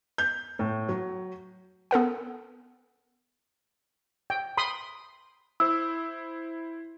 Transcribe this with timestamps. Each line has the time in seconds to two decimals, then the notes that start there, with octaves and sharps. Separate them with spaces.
0.18 G6
0.59 A2
0.89 F#3
1.91 B3 A4 A#4 F#5
4.30 G5
4.57 B5 C6 D#6
5.60 E4 C5 E6